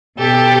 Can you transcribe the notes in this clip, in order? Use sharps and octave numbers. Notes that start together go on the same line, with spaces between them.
B2 G4 A4